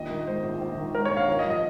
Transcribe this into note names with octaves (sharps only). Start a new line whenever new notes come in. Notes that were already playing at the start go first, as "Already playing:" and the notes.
Already playing: A#1 D#2 D#5
D#3
G#2 C5
A#1
A#1
D#3
G#2 A#4
C#5
A#1
F5
D#2
D#5
F3
D#5